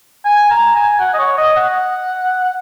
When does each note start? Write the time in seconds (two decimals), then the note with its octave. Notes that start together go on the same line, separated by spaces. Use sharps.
0.25 G#5
0.51 A#5
0.76 G#5
1.00 F#5
1.14 D#5
1.19 C#5
1.38 D#5
1.57 F#5
2.45 F#5